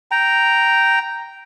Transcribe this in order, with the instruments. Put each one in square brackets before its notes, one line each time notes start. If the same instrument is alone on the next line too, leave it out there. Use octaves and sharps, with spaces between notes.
[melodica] G5 A#5